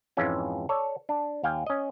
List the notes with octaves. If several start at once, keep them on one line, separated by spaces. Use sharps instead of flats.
F2 G#2 E3 G#3 C#4 F4
A4 C#5 D5
D4
D#2 F5 G5 G#5
C#4 D#5